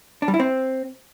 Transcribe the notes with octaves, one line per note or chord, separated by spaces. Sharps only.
D4
G3
E4
C4